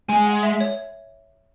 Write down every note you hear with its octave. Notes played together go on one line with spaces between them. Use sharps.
G#3 G#5
F#5
E5
C#5